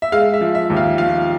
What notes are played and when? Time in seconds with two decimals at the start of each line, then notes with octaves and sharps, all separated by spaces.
0.02 E5
0.12 G#3 F5
0.34 E5
0.41 F3
0.55 E5
0.70 D#2
0.77 F5
0.98 F3 F5